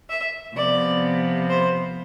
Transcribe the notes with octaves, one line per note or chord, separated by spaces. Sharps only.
E5
C3 F3 B3 D5
C5